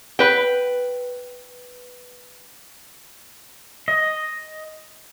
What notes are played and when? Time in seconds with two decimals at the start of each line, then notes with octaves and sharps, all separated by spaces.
0.19 B4 G5
3.88 D#5